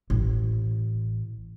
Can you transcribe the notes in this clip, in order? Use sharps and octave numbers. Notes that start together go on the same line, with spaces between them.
A1